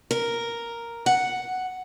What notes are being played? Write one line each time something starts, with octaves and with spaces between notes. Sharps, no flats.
A#4
F#5